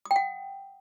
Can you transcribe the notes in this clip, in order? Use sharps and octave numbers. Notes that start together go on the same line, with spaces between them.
D#6
G5
F#5